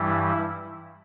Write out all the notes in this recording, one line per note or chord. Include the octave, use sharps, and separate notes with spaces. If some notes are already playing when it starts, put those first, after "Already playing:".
Already playing: G2 E3 G3 E4